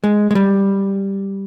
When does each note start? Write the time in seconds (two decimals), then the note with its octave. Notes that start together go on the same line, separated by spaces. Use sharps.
0.04 G#3
0.31 G#3
0.35 G3